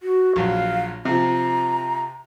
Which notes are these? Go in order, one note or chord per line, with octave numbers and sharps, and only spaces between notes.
F#4
A#1 F#3 F5
C3 F3 A#5